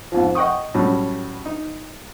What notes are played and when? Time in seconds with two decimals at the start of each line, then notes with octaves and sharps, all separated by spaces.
0.12 F2 G#2 F3
0.35 D#5 F#5 G5 C#6 D#6
0.74 A2 F#3 G3 C#4
1.46 D#4